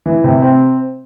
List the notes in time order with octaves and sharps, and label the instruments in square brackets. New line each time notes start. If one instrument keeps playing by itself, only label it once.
[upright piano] E3
C3
C4